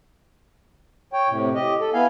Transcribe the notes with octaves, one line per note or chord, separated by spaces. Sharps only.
C#5 G5
A2 C3
G4 D#5
A4
B3 E4 F5 G#5